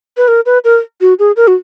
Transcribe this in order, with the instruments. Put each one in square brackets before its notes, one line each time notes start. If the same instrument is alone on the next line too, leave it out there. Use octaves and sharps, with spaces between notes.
[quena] B4
A#4
B4
A#4
F#4
G#4
A#4
F#4